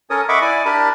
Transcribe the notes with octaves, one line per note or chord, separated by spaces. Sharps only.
C#4 A4 A#4 C#5 D#6
D#5 E5 F#5 B5 C#6 D6
E4 D5 G#5 D6
D4 G4 A#4 A5 B5